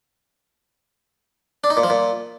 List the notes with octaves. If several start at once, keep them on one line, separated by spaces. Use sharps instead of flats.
D4
D#4
A#2
F3
A#2